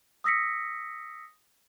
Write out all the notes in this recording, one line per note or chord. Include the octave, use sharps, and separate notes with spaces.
D#6 E6 A#6 B6 C#7